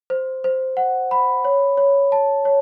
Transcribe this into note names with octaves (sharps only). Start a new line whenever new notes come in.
C5
C5
F#5
B5
C#5
C#5
A5
C#5